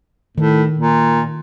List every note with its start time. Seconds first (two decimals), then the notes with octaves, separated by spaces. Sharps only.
0.38 A2 D#3
0.77 A#2